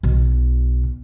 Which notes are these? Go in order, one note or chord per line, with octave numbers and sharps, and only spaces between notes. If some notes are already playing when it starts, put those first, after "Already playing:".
B1 B2